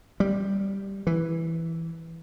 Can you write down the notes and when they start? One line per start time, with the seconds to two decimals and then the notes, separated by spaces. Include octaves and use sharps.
0.20 G3
1.07 E3